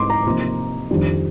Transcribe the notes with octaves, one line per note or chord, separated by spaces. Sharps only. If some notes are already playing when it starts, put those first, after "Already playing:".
Already playing: G#2 C4 D#4 C6 D6
A#5
C3 F3 A#3 D#4
F2 D#3 G3 D4